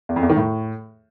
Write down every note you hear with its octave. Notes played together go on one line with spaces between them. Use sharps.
E2
F2
E2
D#3
A2